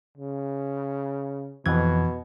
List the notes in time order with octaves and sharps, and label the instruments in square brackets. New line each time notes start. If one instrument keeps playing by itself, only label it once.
[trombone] C#3
[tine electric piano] F2 E3 G#6 [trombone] B2